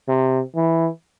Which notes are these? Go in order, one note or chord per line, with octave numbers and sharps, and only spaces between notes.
C3
E3